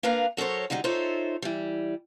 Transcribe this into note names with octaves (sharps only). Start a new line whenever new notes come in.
A#3 D4 A#4 B4 F5 A#5
F#3 A4 A#4 C5 C#5
D3 F#3 G3 D#4 G#4
D#4 F4 A4 C5 C#5 E5
E3 G3